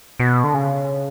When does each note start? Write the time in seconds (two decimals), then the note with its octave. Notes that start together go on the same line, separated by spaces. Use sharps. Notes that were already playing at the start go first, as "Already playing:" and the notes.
0.20 B2
0.44 D3
0.54 C#3